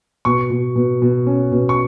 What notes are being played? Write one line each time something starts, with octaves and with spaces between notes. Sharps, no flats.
B2 C#6
B2
B2
B2
C#4
B2
C#6